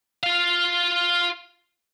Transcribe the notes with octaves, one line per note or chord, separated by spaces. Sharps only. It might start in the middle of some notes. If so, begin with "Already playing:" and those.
F4 F5